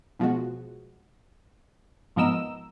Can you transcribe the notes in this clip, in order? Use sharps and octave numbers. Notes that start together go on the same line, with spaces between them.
B2 F3 G#3 F#4
G#2 F3 B3 A#4 D#5 E6